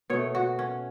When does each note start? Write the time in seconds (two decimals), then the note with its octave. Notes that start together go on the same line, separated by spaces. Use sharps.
0.10 B2 A3 C#5
0.35 F#4
0.59 C#4